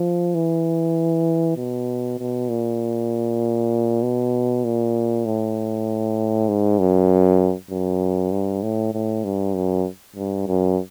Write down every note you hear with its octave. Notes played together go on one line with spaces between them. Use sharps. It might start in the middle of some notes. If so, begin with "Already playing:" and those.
Already playing: F3
E3
B2
B2
A#2
B2
A#2
A2
G#2
F#2
F#2
G2
A2
A2
G2
F#2
G2
F#2